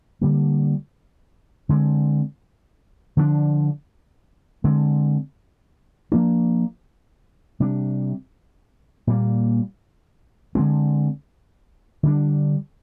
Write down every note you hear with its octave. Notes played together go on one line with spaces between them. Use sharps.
D3 G3 A#3
D3 G#3 C4
D3 F3 G#3 D4
D3 G#3 C4
F3 A#3 D4
C3 G3 D4
A#2 G3 A#3
D3 G#3 C4
D3 G3 D4